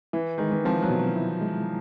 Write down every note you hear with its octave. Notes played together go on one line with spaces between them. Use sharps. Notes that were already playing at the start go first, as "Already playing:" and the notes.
E3 E4
D#3 G#3
E3
F3 C4
F#3
B2
F#3
E4
G#3